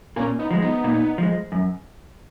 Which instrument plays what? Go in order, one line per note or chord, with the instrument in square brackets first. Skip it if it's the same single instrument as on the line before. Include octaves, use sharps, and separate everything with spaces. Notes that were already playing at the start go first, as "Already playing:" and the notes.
[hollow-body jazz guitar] A#2 [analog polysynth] A#3 C#4
[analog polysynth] B3 D#4
[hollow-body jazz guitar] F3 G#3
[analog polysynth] B3 D#4
[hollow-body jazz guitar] A#2
F3 G#3
F#2